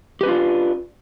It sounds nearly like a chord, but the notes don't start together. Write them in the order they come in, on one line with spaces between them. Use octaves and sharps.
G4 B4 C#4 F4 D4